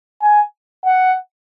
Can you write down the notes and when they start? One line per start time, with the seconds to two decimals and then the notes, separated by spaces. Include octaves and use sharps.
0.22 G#5
0.86 F#5